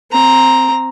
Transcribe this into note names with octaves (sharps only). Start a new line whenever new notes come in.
C4 A#5